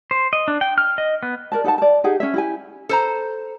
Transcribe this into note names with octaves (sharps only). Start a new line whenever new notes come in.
C5
D#5
D4
G5
F6
D#5
B3
A#4 D5 A5
D#4 A4 F#5 A5
D5 A5
D#4 G4 G#4 F#5
C#4 C#5 E5
E4 G4 G#5
A4 C5 A#5